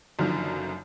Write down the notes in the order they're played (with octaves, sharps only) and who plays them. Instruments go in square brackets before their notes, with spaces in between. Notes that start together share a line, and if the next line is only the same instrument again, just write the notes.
[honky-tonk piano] F#1 F#2 D3 D#3 F3